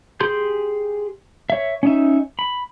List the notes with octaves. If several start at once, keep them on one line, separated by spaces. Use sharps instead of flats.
G4 G#4 C6 G6
C#5 E5
C#4 D#4 E5
B5